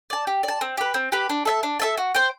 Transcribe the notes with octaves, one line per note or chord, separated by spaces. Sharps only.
D5 A5
G4
D5
A5
C4
G4 B4
C4
G4 B4
D4
A4 E5 A5
D4
A4 E5 A5
F#4
C5 G5